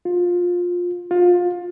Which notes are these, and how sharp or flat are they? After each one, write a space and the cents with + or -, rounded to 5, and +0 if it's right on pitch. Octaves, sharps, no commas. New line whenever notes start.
F4 +20
F4 +25